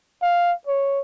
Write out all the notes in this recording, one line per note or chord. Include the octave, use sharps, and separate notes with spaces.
F5
C#5